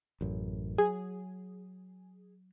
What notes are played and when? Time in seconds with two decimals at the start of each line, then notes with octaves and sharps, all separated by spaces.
0.21 A1 F#2
0.78 F#3 G#4